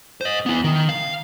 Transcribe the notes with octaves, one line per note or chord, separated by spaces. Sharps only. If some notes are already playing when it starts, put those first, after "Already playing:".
C5 D#5
B3 E4
D#3
F5